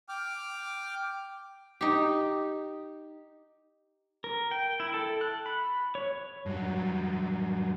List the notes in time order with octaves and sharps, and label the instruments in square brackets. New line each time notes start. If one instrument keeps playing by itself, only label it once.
[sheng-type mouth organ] G5 D6 F6
[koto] D#4 G4
[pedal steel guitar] A#4
G5
E4
A4
F#6
B5
C#5
[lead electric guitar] G2 F#3